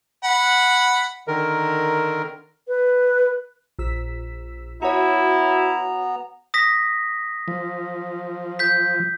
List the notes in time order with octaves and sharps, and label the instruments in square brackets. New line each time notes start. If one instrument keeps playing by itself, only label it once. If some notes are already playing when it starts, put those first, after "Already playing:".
[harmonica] F#5 B5
[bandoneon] D3 D#3 A#4
[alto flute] B4
[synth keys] A#1 E6 B6
[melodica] B3 A#5 [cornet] E4 [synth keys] F#4 C#5
[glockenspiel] D#6 A#6 B6
[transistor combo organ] F3
[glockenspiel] G6 B6